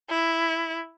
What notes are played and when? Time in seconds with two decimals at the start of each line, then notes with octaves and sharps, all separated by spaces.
0.10 E4